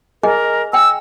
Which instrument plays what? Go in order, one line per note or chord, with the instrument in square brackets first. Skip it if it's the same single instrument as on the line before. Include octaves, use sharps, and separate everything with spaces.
[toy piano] G#4 D#5 G#5 [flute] A#4
[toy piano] G5 G#5 [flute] E6